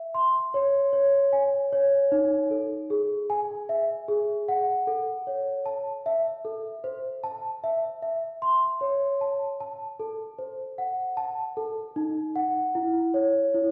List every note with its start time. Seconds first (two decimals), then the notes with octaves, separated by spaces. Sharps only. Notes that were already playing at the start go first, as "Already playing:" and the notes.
Already playing: E5
0.15 C6
0.54 C#5
0.93 C#5
1.33 G#5
1.73 C#5
2.12 D#4
2.51 A4
2.90 G#4
3.30 G#5
3.69 E5
4.08 G#4
4.49 F#5
4.87 A4
5.27 C#5
5.66 A5
6.06 E5
6.45 A4
6.84 C5
7.24 A5
7.64 E5
8.02 E5
8.42 C6
8.81 C#5
9.21 A5
9.60 A5
10.00 A4
10.39 C5
10.78 F#5
11.17 A5
11.57 A4
11.96 D#4
12.36 F#5
12.75 E4
13.14 C#5
13.54 E4